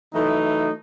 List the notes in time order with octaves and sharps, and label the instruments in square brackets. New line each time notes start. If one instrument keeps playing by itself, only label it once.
[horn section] E3 F#3 A3 D#4